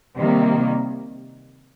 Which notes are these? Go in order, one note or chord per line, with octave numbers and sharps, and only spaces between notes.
C3 D#3 G3 A#3